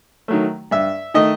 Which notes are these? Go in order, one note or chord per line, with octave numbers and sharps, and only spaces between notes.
D#3 F#3 A3
G2 E5
D#3 A3 D#5